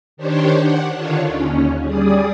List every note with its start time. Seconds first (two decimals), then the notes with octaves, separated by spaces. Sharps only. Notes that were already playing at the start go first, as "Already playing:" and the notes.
0.17 D#3 D4 G4 C5 C#5
0.59 F#5
0.96 D3 D#3 D4 F4 C#5
1.27 D#2 C#4
1.82 G3 G#4 D5 D#6